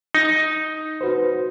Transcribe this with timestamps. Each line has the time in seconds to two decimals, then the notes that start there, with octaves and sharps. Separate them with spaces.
0.14 D#4
1.01 F#4 B4 C5